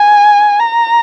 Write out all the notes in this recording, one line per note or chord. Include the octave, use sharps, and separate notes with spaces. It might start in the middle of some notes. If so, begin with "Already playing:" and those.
Already playing: G#5
A#5